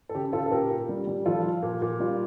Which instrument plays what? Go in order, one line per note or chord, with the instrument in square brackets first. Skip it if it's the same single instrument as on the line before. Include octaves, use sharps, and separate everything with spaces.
[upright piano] A4
C#3 G4
C#3 F4 A4
A4
A#2 G4 A#4
A#2
G3
G3
F3 F4 A4
F3
A#2
A#2
G3 F4